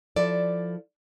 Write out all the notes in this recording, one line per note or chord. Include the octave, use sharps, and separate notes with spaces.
F3 E4 A4 D5